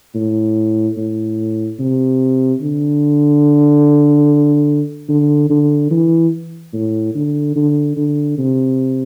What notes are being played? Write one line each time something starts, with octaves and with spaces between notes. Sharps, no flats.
A2
A2
C3
D3
D3
D3
E3
A2
D3
D3
D3
C3